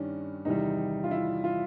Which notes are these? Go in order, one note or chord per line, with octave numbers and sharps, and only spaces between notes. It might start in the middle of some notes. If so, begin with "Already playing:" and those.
Already playing: G2 D#3 G3 C#4 D4
E2 C3 D#3 G3 D#4
F4
E4
F4